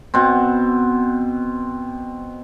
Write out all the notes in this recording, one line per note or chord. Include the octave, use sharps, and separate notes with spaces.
B2 C4